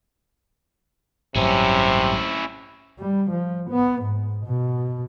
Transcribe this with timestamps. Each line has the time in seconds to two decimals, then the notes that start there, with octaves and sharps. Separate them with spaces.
1.36 A1 G2 C3 F#3 C#4 E4
2.99 G3
3.31 F3
3.71 B3
4.03 G#2
4.46 B2